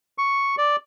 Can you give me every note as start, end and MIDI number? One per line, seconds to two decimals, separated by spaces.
0.18 0.56 85
0.58 0.76 74